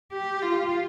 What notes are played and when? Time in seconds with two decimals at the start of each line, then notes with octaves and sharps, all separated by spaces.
0.12 G4
0.42 F4